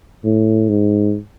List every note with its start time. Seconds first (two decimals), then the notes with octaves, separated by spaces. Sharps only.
0.24 A2
0.69 G#2